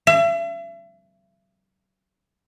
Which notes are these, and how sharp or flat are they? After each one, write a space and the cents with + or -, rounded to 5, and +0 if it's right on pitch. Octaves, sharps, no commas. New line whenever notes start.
E5 +40